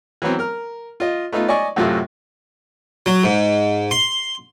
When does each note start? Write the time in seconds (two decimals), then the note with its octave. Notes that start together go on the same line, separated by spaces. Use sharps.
0.22 E3 F#3 B3 C4
0.39 A#4 F6
1.00 F4 D#5
1.32 A3 B3 D#4 F4
1.48 D5 D#5 G#5 C#6
1.76 F#2 A2 C3 A3 F4 F#4
3.06 F#3
3.24 G#2
3.91 C6